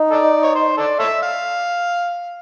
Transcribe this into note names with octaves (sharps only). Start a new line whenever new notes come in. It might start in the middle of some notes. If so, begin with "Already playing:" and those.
Already playing: D#4
A4 D5
C#5
C5
A4 D5
A4 C#5 E5
F5